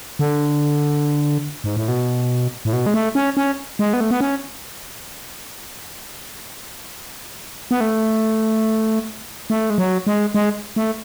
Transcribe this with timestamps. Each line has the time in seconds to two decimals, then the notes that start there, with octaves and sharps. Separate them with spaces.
0.19 D3
1.64 G#2
1.77 A2
1.88 B2
2.65 A2
2.73 B2
2.86 G#3
2.94 A3
3.15 C#4
3.37 C#4
3.79 G#3
3.93 B3
4.01 A3
4.11 B3
4.21 C#4
7.71 B3
7.81 A3
9.50 A3
9.70 G#3
9.78 F#3
10.07 G#3
10.35 G#3
10.76 A3